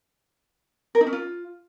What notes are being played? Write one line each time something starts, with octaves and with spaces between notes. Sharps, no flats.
A#4
D#4
C#4
F4